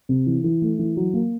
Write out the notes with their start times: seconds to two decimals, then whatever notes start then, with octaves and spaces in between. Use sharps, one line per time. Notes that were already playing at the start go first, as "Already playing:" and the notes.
0.09 C3
0.27 E3
0.44 E3
0.62 A3
0.79 E3
0.97 F#3
1.14 A#3